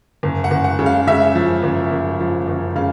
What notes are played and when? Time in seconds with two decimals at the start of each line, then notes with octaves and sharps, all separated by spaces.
0.23 F#1
0.44 F#5
0.51 F#1
0.64 F#5
0.79 C#3
0.86 F5
1.07 C#3 E5
1.35 F3
1.63 F#1
1.91 F#1
2.20 F3
2.48 F#1
2.75 C#3 F5